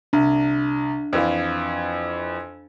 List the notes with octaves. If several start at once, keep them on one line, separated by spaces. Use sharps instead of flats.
C2 D4
F2 E3 F5